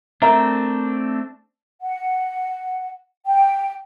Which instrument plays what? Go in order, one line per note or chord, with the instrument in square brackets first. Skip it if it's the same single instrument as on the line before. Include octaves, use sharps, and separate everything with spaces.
[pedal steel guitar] A3 C4 D4 [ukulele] A#4 E5 A#5
[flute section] F#5
G5